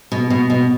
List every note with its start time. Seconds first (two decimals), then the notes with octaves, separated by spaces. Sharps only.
0.12 B2
0.30 B2
0.50 B2